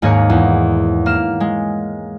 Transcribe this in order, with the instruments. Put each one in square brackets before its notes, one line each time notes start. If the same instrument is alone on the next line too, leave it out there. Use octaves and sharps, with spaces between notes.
[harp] D#2 G#2 A#3 G#4 A#4 C#5
E2
A#3 F6 E7
G#3